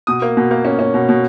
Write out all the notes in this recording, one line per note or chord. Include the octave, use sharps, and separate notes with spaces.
B2 D#6
A#3
B2
A#3
C#4
C#4
B2
B2